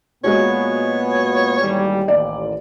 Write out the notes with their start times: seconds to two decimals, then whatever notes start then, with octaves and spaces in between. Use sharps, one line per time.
0.24 A#2 G#3 B3 F#4 C#5
1.61 A1 D#2 G3
2.08 A1 D#2 D5